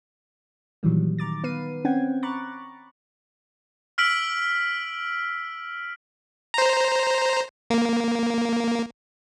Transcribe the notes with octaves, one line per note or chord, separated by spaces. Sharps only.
A#2 D#3 E3 F#3 G3
D#3 A#5 D6 A6
D#3 B3 B4 F5 C7 D#7
C4 C#4 F#5 G5 G#6
A#5 B5 C#6 D6 F#6 A6
E6 F6 B6 D7 F#7
C5 A#5
A#3